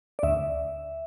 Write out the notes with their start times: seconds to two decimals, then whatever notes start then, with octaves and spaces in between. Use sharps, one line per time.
0.19 D5
0.23 D2 E5